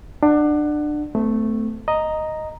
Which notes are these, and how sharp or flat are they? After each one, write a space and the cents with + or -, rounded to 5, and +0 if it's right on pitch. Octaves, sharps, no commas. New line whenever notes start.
D4 +25 F#5 +0
A3 +0 C4 -40
D#5 +0 A#5 +0